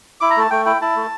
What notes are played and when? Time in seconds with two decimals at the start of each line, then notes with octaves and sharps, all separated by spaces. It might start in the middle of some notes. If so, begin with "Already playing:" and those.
0.21 E4 D6
0.31 A#5
0.37 A3 A5
0.51 A3 G5
0.65 E4 G5
0.82 E4 A5
0.96 A3